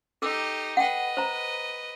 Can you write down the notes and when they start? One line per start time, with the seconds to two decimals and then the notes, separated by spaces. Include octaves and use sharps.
0.22 D#4 G4 A4 D6 E6
0.77 B4 D#5 F#5 G5
1.17 C5 A#5